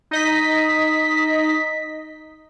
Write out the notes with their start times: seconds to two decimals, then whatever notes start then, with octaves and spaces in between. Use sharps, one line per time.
0.11 D#4 D#5 B6